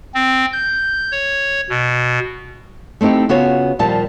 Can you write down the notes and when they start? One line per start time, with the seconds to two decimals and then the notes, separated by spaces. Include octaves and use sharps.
0.14 C4
0.53 G6
1.12 C#5
1.70 B2
3.01 A3 C4 D#4 E4 G4
3.29 C#3 B3 F4 F#4 C#5
3.79 D#2 A#2 F3 G3 A5